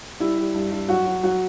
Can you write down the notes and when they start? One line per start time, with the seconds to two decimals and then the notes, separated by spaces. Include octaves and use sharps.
0.20 G3 E4
0.38 G3
0.55 G2
0.71 G2
0.88 F#3 F#4
1.07 F#3
1.23 F#3 F#4